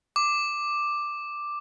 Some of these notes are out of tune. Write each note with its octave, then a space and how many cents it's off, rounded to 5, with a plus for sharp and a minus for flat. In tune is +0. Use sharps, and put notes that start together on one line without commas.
D6 +5